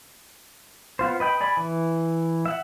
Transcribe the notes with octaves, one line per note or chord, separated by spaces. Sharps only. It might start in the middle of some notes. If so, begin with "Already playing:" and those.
B3 F4 C5
B4 D#5 G5 B5
G#4 D5 B5
E3
E5 F#5